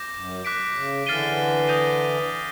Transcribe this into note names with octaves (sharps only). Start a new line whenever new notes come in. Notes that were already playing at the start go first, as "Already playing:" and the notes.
Already playing: D6 G6 A#6
F#2
D6 F#6 B6 D7
C#3
D3 E3 F6 A6 C7 D#7 G7
D#6 G6 A#6 D#7